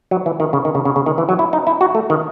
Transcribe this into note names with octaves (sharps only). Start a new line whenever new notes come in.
F#3
E3
D#3
C#3
D#3
C#3
C#3
C#3
D#3
E3
F#3
E4
D#4
E4
F#4
A3
D#3